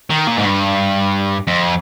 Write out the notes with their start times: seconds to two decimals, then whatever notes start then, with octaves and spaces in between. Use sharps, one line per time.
0.10 D#3
0.28 A#2
0.38 G#2
0.45 G2
1.47 F2